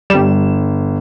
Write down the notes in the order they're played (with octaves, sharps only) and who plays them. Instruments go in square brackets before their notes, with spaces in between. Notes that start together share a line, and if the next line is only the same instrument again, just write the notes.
[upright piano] G1 E7 [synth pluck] G3